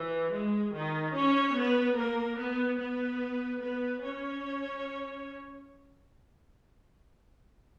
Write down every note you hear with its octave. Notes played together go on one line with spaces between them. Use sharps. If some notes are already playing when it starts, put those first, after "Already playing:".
Already playing: E3
G#3
D#3 D#4
C#4 C#5
B3 B4
A#3 A#4
B3 B4
B3 B4
B3 B4
C#4 C#5